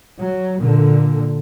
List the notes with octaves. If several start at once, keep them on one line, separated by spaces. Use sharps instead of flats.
F#3
A#2 D3